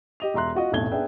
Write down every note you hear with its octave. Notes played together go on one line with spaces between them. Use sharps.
G4 D#5 F7
E1 E5 A#5 C6 F#6
F4 F#4 D#5
F1 B1 A2 A3 G#6 G7
B3 D4 G#4 E5 G5